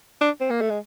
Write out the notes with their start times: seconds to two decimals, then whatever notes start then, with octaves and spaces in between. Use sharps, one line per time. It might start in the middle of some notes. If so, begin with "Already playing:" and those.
0.21 D4
0.41 C4
0.50 A#3
0.61 A3
0.70 G#3